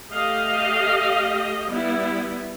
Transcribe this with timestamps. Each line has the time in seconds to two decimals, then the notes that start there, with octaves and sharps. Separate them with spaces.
0.10 A3 G4 D#5 F5
1.68 G3 B3 E4